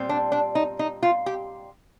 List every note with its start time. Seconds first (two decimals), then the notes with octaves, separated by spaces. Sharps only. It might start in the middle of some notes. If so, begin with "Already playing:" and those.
Already playing: A#2 G3 C4
0.09 D4
0.32 D4
0.55 D#4
0.79 D#4
1.03 F4
1.26 G4